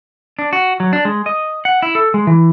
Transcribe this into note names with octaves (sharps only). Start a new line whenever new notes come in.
D4
F#4
F#3
D4
G#3
D#5
F#5
E4
A4
G#3
E3